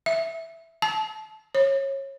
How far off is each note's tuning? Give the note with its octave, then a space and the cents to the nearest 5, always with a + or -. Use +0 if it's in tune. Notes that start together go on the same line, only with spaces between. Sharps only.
E5 +0
A5 -25
C#5 -25